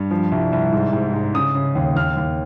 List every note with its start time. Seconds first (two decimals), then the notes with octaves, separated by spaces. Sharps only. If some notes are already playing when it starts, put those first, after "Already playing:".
Already playing: G2
0.11 F3
0.32 C2
0.53 C2
0.72 G#2
0.93 G#2
1.13 G#2
1.34 C#3 D#6
1.55 C#3
1.75 D#2
1.96 D#2 F6
2.17 D#2